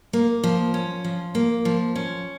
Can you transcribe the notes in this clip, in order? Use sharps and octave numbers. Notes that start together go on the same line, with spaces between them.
A#3
F3
C#4
F3
A#3
F3
C#4